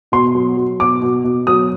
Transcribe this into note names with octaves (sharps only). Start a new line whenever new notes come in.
B2 C6
F#3
F#3
B2 D6
B2
B2
F#3 D#6